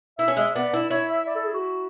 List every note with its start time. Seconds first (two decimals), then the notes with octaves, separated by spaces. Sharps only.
0.19 E4 E5
0.28 C#4
0.37 G#3 E5
0.55 B3 D5
0.74 E4
0.90 E4 C#5
1.09 E5
1.27 D5
1.35 A4
1.45 G#4
1.54 F#4